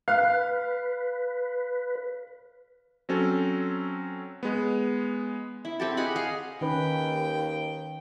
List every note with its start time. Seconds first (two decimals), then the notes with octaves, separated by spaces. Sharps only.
0.08 B4 F5
3.09 F#3 C4 C#4 A4
4.43 G#3 B3
5.65 E4
5.80 C4 G4 A4
5.97 G#4 D#5 F#5 B5
6.16 G#4 F5
6.61 D#2 D#3 C#4 B4 G5